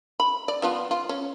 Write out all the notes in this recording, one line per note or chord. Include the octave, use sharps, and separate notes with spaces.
B5
D5
F3 B3 F4
F4
C#4